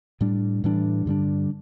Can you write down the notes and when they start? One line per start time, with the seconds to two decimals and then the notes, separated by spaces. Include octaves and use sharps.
0.21 A2 G3 D4
0.64 A2 E3 G3 D4
1.06 G2 D3 G3 D4